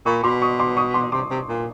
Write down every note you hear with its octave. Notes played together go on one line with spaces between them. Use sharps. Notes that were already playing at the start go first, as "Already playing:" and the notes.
A#2 B5 C#6
B2 C6 D6
C#6 D#6
C6 D6
C#6 D#6
C6 D6
C3 C6 D6
C3
A#2